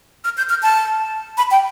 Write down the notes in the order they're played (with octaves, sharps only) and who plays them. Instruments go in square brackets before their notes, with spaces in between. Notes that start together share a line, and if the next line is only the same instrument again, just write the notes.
[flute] F6
G6
F6
A5
B5
G5